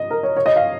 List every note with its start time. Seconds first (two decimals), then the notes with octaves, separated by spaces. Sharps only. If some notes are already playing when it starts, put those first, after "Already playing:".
Already playing: D#5
0.11 A#4
0.23 C#5
0.37 C#5
0.46 D#5
0.56 F5